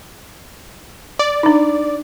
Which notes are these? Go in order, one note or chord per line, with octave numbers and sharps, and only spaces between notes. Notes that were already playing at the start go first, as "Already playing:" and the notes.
D5
D4 D#4